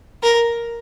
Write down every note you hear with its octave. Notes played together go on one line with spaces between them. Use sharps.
A#4